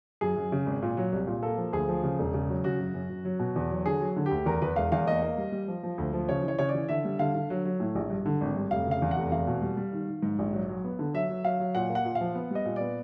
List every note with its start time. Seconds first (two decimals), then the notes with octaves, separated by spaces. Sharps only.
0.21 F#2 G#4
0.36 F#2
0.52 C#3
0.66 G#1
0.82 A#2
0.97 F#3
1.12 C2
1.27 A#2
1.43 A#3 A4
1.58 F3
1.72 D2 G#4
1.89 F3
2.03 C#3
2.19 E1
2.34 C#3
2.49 F#3
2.64 C#3 F#4
2.80 F#2
2.94 F#2
3.10 F#2
3.25 F#3
3.39 B2
3.56 E2
3.71 F#3
3.85 D3 G#4
4.00 F#3
4.16 D3
4.26 D2 G4
4.46 E2 A#4
4.62 E2 B4
4.76 E1 F5
4.92 E2 F5
5.07 A#3 D#5
5.22 A#3
5.38 G3
5.52 G3
5.68 F3
5.83 F3
5.98 D2
6.13 F3
6.29 C#3 C#5
6.43 E3
6.48 C#5
6.59 C#3 C#5
6.69 D5
6.74 E3
6.89 D3 E5
7.05 G3
7.19 D3 F5
7.35 D3
7.50 F#3
7.65 F#3
7.80 A2
7.95 A#1
8.10 G2
8.26 D3
8.41 G#1
8.56 G2
8.71 F1 F5
8.87 C#3 F5
9.02 E2
9.11 F#5
9.17 F1
9.32 E2 F5
9.47 B2
9.62 G3
9.77 G3
9.92 D#3
10.08 D#3
10.23 G#2
10.39 A#1
10.53 F#3
10.69 F#3
10.84 B3
10.99 D3
11.14 F#3 E5
11.29 F#3
11.44 F#3 F5
11.60 F#3
11.75 A#2 F#5
11.90 A#3
11.95 F#5
12.05 A#2
12.15 F5
12.21 F3
12.35 B3
12.51 G3 D#5
12.65 A#2
12.76 B3 D5